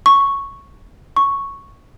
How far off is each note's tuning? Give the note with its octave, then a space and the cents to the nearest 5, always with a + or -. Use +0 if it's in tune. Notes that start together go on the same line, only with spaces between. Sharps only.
C#6 +0
C#6 +0